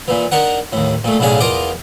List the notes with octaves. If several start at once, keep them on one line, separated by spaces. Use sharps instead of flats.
A#2 E3
D4 D#4 A#4 F#5
D#2 A2
A#2 A3
B1 A2 C#3 D4 G#4 F5
E2 F4 A#4 D#5 A#5 D6